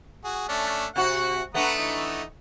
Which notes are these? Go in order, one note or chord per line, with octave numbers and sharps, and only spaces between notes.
F#4 G#4
A3 C#4 D4
C3 F#4 F#5
A3 B3 D4 F#5 A#5 D#6
E3 D#4